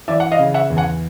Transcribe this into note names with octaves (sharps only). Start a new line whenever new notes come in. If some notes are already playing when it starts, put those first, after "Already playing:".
E3 D5 E5
F#5
D#5 F5
C#3
E5 F#5
E2
F#5 G#5